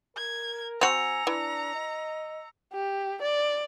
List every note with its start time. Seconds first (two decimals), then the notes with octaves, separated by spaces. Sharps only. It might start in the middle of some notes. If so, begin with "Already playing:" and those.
0.17 A#4 G#6
0.81 C4 F#4 G#5 A#5 E6 C#7 F7
1.27 E3 D4
1.75 D#5
2.73 G4
3.22 D5